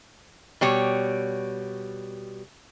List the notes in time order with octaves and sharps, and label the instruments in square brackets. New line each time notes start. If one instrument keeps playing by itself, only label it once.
[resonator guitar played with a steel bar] B2 G3 C#5